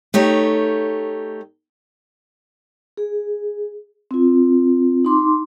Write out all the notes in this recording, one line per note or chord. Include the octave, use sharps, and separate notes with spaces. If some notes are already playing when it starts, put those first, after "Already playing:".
A3 D#4 G4 C#5
G#4
C4 F4
D#4 C6 D6